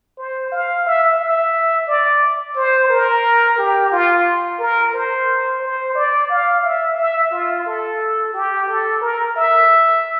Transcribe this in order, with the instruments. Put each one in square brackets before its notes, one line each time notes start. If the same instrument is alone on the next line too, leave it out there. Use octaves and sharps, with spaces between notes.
[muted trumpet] C5
F5
E5
E5
D5
C5
A#4
G4
F4
A#4
C5
C5
D5
F5
E5
E5
F4
A4
G4
A4
A#4
E5